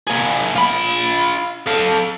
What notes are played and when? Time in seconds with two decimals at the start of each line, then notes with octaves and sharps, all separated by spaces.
0.07 A#3 G#4
0.56 F4 B5
1.67 A4 F5